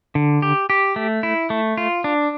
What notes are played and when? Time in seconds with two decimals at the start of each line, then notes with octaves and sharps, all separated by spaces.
0.15 D3
0.42 G4
0.70 G4
0.96 A3
1.23 E4
1.50 A3
1.77 F4
2.04 D4